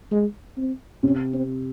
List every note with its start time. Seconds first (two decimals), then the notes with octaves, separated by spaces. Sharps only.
0.12 G#3
0.57 C4
1.03 C3 C#4
1.34 C4